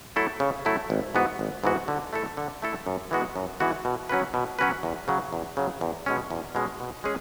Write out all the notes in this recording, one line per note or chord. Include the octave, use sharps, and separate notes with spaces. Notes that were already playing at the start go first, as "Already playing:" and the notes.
F#3 A3 E4 A4
C#3
F#3 A3 E4 A4
G#1
G#2 E3 B3 F#4
G#1
G#2 E3 B3 F#4
D3
A3 E4 A4
D3
A3 E4 A4
F#2
E3 G#3 B3 F#4
F#2
E3 G#3 B3 F#4
B2
F#3 C#4 F#4 B4
B2
F#3 C#4 F#4 B4
E2
C#3 F#3
E2
C#3 F#3
E2
B2 G#3 C#4
E2
B2 G#3 C#4
B2
G#3 C#4 G#4 C#5